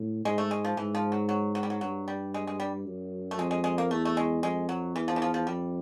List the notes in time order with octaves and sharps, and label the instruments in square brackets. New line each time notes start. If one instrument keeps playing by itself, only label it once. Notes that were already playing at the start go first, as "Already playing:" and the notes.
Already playing: [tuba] A2
[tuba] G#2 [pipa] G#3
[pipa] A3
G#3
F3
[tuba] G#2 [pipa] E3
[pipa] F3
F#3
F#3
F#3
G3
F#3
[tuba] G2 [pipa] F#3
[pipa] G3
G#3
G#3
G3
[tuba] F#2
[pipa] A3
[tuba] F2 [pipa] G#3
[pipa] G#3
G#3
A#3
[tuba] E2 [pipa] A3
[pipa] A3
G#3
[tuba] F2 [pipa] G#3
[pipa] F#3
[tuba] E2 [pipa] E3
[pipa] F3
E3
F3
F3
[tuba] F2 [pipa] G3